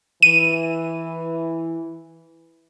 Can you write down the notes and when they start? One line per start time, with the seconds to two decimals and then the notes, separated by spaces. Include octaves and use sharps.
0.23 E3 D#7